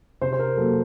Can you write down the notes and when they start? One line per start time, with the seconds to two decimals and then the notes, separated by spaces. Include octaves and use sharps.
0.21 C3 C5
0.33 C5
0.39 A#4
0.57 F#3 A#3 A4